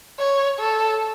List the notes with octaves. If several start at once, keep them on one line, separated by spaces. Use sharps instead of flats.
C#5
A4